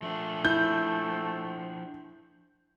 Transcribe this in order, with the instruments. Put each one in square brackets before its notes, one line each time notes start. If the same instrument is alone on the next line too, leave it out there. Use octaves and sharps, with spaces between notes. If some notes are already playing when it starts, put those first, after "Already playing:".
[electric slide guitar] F3 D4 [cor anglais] A3
[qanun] E4 [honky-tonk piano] G6